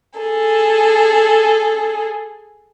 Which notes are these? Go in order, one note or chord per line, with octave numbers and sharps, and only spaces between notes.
G#4 A4